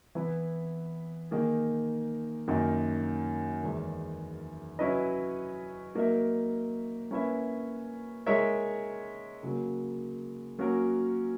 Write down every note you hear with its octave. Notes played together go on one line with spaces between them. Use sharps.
E3 B3 E4 B4
D#3 A#3 D#4 G#4
F#2 D#3 A#3
E2 D#3 G#3
F#3 C#4 E4 B4 D#5
F#3 A#3 D#4 A#4 E5
A#3 C#4 E4 B4 E5
G#3 D#4 A#4 C#5 E5
C#3 F#3 A#3
F#3 A#3 C#4 F#4 A#4